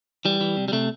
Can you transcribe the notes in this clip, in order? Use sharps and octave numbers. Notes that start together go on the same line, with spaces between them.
E3 G3
E3
C3
G3
C3 A3